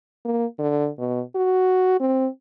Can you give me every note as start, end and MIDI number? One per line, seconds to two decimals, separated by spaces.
0.25 0.45 58
0.59 0.88 50
0.98 1.21 47
1.35 1.98 66
2.00 2.27 60